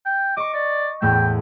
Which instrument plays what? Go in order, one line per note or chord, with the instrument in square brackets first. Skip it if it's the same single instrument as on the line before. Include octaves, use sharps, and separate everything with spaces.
[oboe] G5
[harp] D#5 C#6 [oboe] D6
[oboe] D5
[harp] E2 A2 A3 [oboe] G5